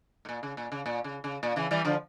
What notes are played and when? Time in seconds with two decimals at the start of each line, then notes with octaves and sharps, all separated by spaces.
0.25 A2
0.29 A#2
0.43 C#3
0.57 A#2
0.72 C#3
0.86 A#2
1.04 C#3
1.24 C#3
1.43 A#2
1.56 C#3 E3
1.71 E3 G3
1.85 D3 F3